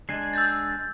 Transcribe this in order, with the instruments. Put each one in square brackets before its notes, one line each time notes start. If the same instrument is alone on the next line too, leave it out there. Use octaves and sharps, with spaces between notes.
[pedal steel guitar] G#3 D4 G#5 [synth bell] C7
[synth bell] E6 G6 A6